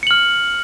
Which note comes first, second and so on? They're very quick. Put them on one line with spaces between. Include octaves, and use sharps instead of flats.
C#7 F#7 F6